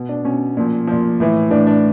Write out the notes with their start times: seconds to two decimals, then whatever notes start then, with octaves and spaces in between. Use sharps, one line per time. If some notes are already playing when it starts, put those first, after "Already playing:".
Already playing: B2
0.09 D4
0.24 B2 C#4
0.57 A#2 F3
0.87 A#2 F3
1.20 A2 E3
1.50 A2 E3 D4
1.67 D4